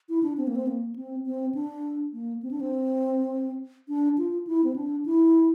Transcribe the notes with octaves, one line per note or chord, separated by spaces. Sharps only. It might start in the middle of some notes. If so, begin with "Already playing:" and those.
E4
D4
C4
A#3
C4
A#3
C4
C4
D4
A#3
C4
D4
C4
D4
F4
E4
C4
D4
E4